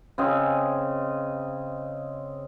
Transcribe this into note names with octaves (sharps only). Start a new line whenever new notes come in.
C#3 C4 D#5